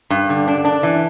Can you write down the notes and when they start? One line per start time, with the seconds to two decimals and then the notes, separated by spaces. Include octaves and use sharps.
0.10 G2
0.29 D3
0.48 D4
0.65 D4
0.83 E3